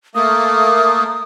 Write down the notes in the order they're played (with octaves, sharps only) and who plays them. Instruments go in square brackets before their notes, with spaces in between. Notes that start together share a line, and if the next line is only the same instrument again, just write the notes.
[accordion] A3 A#3 [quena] D#6